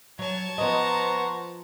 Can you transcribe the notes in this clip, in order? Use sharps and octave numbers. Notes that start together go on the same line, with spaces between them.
F#3 C#5 A5 G#6
F3 B3 C5 D#5 A#5 C#6